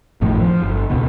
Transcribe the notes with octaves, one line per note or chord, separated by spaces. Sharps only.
G#1 F2 A2 D#3
F3
G1
D#1 C#2 B2